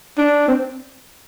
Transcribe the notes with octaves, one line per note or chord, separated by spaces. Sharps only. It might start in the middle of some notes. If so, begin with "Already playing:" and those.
D4
C4